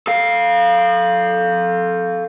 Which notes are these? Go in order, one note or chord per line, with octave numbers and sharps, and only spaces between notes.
A4 F5